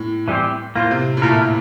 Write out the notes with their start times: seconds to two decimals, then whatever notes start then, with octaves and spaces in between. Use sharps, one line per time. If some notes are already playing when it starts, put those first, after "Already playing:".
Already playing: A2
0.28 E3 G3 C4 G4 C5
0.76 A2 A#3 F4 C5
0.91 C3
1.17 A2
1.22 A#2 A3 E4 A#4